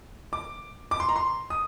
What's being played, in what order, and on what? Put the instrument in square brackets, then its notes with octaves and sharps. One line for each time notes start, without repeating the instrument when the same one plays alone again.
[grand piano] D6
D6
C6
A#5
C6
D#6